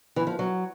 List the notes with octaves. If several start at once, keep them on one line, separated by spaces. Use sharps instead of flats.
E3
F3
F#3